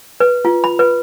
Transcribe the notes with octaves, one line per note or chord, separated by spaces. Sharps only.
B4
F4
B5
B4